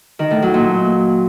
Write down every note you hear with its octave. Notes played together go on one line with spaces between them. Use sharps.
D#3
A2
F#3
A#2